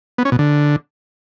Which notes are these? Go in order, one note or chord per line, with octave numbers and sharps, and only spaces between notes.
B3
C#4
B2
D3